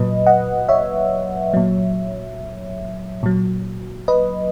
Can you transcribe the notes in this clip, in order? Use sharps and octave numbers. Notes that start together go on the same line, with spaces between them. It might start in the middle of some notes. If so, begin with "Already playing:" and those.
Already playing: A#2 F#3 B4 D#5
D#5 F#5
C#5 E5
A#2 F#3
A#2 F#3
B4 D#5